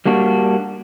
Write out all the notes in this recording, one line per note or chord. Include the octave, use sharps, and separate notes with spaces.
G3 A#3 D4 F#4